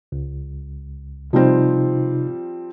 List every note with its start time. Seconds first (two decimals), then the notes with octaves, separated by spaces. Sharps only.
0.12 C#2
1.33 C3 F3 G3 C4 D#4